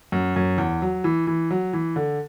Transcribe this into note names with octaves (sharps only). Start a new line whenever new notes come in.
F#2
F#2
E2
F#3
E3
E3
F#3
E3
D3